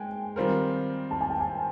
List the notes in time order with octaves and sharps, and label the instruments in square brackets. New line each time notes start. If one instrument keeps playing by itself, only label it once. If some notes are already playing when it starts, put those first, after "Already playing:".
Already playing: [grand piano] G#3 [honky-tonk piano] G5 G#5
[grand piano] D#3 G3 C4 F4 A#4
[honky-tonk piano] A5
G#5
G5
G#5